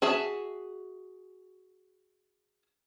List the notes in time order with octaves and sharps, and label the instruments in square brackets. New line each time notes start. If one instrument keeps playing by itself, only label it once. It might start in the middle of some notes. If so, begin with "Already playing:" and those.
[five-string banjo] F#4 G#4 E5 A5